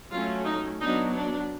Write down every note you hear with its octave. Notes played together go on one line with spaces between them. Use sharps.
F#3 A3 C#4 F4
D#4
F#3 B3 D4 D#4
D4